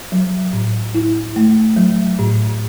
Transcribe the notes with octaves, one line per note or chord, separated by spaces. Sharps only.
F#3
A2
E4
A3
F#3
A2